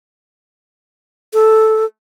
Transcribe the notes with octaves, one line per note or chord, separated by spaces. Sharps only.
A4